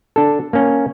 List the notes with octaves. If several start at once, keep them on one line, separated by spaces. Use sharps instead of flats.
D4 A4
A#3 C#4